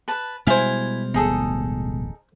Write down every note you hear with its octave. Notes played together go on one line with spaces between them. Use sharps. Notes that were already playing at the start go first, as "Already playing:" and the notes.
B4 A5
B2 G3 G#3 E4 C5 F5 G#5
D1 A1 B3 D#4 G#4 A4